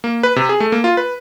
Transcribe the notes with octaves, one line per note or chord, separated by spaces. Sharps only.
A#3
B4
C3
G#4
A3
A#3
F4
B4